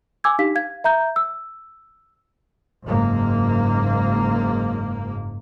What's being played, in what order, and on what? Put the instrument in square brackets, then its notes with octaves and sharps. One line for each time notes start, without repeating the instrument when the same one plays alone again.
[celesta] G#5 D6 E6 G#6
D4 D#4 G4 F5 B6
F5 G#6
E5 A#5 G6
E6
[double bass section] F#1 G#2 A#3